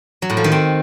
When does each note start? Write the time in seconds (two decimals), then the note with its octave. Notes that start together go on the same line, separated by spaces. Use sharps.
0.22 F#3
0.30 A2
0.37 F3
0.44 D#3
0.52 C4